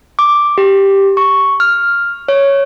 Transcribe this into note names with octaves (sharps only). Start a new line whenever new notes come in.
D6
G4
C#6
F6
C#5